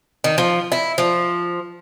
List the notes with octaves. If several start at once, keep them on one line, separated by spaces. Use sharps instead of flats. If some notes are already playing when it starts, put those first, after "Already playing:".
D#3
F3
E4
F3